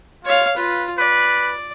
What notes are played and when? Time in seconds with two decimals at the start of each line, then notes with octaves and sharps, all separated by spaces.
0.25 F4 C#5 F5
0.56 F4 B4
0.98 B4 D5